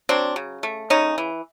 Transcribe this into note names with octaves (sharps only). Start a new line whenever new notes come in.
F#3 C4 D4
C#3
A3
C#3 C#4 D#4
E3